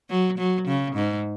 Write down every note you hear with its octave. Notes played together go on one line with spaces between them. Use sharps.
F#3
F#3
C#3
G#2